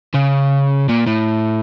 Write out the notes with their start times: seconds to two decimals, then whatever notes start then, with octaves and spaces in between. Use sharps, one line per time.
0.14 C#3
0.89 A#2
1.07 A2